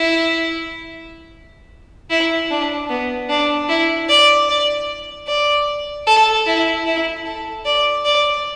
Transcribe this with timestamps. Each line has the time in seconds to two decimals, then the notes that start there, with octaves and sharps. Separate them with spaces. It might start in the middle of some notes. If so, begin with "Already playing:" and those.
Already playing: E4
2.10 E4
2.51 D4
2.89 B3
3.29 D4
3.69 E4
4.09 D5
4.49 D5
5.27 D5
6.07 A4
6.46 E4
6.86 E4
7.25 A4
7.65 D5
8.04 D5